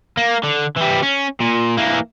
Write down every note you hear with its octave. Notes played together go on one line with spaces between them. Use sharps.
A#3
D3
E3 G3
C#4
A#2
E3 A#3